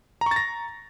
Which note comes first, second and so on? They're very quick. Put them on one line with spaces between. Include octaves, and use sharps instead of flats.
A#5 C#6 A6 A#6